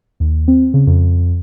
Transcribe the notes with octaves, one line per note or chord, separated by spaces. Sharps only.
D#2
C4
C#3
F2